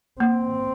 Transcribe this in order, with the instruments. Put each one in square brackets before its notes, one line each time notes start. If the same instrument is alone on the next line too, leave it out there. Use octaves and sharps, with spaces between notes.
[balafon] A#3 [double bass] C4